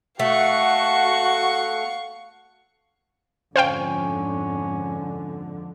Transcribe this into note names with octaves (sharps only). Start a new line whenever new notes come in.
A3 F#4 F5 F#5 C#6
F2 G#2 D3 C#4 C5 F5 G5